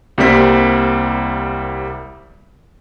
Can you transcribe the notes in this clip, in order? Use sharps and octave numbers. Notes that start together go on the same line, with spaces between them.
C2 G3 A#3 C4 B6